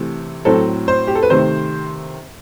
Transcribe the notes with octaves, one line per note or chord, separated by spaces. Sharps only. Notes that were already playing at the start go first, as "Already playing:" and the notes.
Already playing: C3 E3 A3 C4
A2 F#3 C4 A4
C5
G4
A4
B4
C3 D#3 A3 C4 C5